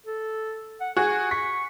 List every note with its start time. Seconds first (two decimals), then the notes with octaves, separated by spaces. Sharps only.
0.06 A4
0.81 F#5
0.97 F#4 G#4 G#5
1.31 C#6 B6